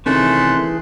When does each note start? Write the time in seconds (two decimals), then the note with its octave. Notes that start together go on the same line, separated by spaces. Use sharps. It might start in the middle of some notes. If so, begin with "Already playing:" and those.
0.06 C3 D#3 E3 A3 C#4 G#4 C6 F#6